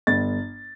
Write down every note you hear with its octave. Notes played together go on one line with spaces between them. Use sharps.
G1 A6